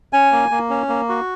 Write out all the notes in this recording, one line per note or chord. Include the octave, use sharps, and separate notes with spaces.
C#4 G#5
A#3
A#3
C#4
A#3
F#4